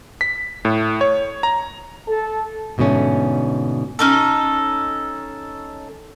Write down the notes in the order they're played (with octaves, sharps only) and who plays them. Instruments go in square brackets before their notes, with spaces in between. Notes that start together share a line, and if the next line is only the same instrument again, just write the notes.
[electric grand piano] B6
A2
C#5
A#5
[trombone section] A4
[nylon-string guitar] G#2 B2 D3 A3 C#4
[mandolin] C#4 D#4 A4